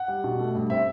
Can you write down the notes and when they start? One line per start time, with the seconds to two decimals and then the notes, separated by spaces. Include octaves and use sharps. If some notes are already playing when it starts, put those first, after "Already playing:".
Already playing: F#5
0.08 G3
0.24 B2
0.39 A3
0.55 G2
0.70 C4 E5